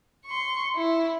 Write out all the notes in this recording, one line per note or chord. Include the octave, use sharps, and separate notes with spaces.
C6 C#6
E4